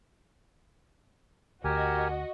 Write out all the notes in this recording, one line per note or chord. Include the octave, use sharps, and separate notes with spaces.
D2 F#4 G4 A#4 D#5 G#5